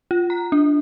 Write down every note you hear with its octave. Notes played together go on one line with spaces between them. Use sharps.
F4
A#5
D4